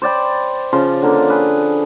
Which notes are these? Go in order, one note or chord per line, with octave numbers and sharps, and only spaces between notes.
C5 D5 G5 B5
C#3 F3 C6
D3 A#3
G#4 B4